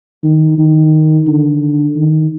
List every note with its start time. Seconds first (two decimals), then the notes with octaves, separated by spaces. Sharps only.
0.23 D#3
0.58 D#3
1.27 D3
1.96 D#3